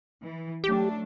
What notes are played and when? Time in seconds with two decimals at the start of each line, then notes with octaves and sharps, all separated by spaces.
0.21 E3
0.64 F#3 A3 D4 G4